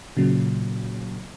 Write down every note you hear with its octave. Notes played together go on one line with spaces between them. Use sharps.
A#2 C#3 F#3